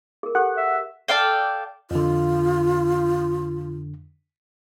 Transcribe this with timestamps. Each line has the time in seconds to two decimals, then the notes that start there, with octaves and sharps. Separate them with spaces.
0.23 G#4 A#4
0.35 G4 A4 F#5
0.57 E5
1.08 A4 D5 F5 G5
1.91 F2 D3 F4